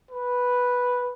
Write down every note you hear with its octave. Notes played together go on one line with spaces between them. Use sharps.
B4